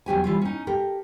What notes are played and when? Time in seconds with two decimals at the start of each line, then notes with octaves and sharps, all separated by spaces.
0.06 E2 F#3 G4 G#5
0.24 E3 G3 F4
0.42 C#4 D#4
0.67 G4 A4 A#4